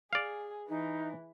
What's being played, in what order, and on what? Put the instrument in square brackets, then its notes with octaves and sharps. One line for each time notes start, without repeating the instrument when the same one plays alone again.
[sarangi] G#4 [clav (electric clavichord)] D5 F5
[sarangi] E3 [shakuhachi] D#4